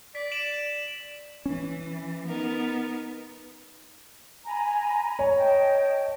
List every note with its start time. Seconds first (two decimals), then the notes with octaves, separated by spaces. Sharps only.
0.15 D5 B6
0.31 D7 E7 F#7
1.46 E3 C#4
2.27 B3 D#4 A#4
4.46 G#5 A#5 B5
5.19 C#5
5.36 D#5 G5 A5